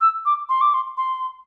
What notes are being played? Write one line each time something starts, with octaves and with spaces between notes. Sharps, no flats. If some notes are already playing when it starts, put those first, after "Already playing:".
E6
D6
C6
D6
C6
C6